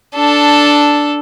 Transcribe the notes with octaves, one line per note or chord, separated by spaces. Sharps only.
D4 A4